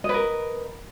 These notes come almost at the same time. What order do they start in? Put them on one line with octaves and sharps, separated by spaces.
D#5 B4 A#4